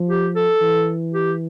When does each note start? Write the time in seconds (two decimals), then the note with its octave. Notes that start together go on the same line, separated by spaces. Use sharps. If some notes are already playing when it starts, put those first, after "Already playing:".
Already playing: F3
0.09 G4
0.36 A4
0.61 E3
1.14 G4